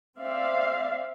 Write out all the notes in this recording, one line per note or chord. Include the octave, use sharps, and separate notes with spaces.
C4 D5 E5 F5